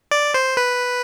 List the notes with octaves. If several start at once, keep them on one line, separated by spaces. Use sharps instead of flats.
D5
C5
B4